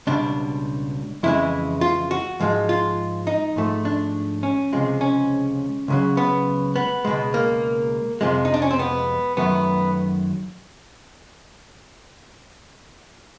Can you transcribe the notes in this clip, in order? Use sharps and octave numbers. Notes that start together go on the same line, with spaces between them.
C#2 B2 G3 D4
F2 C#3 E3 G#3 E4
F4
F#4
G#2 F3 G#3
F4
D#4
G#2 F3 A3
D4
C#4
C#2 C3 F3 G#3
C#4
C#2 C#3 F#3
B3
B3
C#2 B2 G#3
A#3
F2 C3 F3 G#3
D#4
D4
C#4
C4
B3
F#2 D#3 F#3 A3 B3